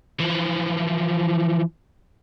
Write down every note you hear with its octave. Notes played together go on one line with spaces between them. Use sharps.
E3 F3